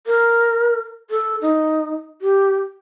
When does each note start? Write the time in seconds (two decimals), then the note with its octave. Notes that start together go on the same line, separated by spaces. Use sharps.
0.07 A#4
1.10 A4
1.42 D#4
2.22 G4